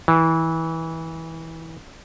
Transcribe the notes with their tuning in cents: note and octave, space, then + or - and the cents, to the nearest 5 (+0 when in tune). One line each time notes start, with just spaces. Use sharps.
E3 -20